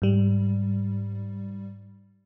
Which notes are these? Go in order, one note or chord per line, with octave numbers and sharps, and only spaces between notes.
G#2 G3